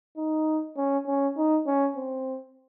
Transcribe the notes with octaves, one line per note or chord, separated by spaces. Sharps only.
D#4
C#4
C#4
D#4
C#4
C4